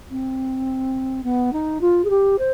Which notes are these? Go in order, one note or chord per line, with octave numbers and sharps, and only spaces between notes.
C4
B3
D#4
F4
G#4
G4
C5